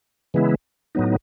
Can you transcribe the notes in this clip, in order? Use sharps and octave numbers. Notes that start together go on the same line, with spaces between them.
C#3 E3 G#3 B3 E4
A2 F#3 B3 D#4